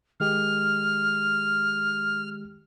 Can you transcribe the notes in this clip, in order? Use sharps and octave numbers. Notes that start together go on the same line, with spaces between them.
D#3 G#3 G4 F6